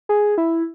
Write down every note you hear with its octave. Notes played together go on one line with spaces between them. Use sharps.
G#4
E4